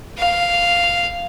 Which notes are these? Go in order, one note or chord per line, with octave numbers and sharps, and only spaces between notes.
F5